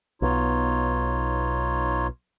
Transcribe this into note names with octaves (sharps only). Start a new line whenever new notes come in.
B1 B3 D#4 F4 C#5